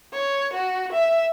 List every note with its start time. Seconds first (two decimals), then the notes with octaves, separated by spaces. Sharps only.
0.13 C#5
0.53 F#4
0.92 E5